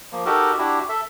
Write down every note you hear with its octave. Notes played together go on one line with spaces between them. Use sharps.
F3 A#3
D#4 F#4 G4 A4 A#4
D4 E4 F#4 G4
A4 E5